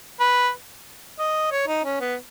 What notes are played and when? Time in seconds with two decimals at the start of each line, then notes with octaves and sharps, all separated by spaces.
0.20 B4
1.19 D#5
1.51 C#5
1.67 D#4
1.85 C#4
2.00 B3